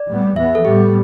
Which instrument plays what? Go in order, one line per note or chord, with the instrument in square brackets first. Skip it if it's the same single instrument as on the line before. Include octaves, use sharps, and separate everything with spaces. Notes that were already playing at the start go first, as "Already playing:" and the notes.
Already playing: [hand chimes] D5
[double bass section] A2 G3 B3
[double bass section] E2 E3 B3 [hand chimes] E5
[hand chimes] A4
[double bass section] A2 G3 B3 [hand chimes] G4